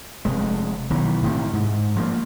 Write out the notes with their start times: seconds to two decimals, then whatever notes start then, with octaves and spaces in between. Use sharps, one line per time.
0.25 F1 G#3
0.90 B1 D#3 E3
1.23 A2 C3 D#3
1.53 G#2
1.96 F3 F#3 A#3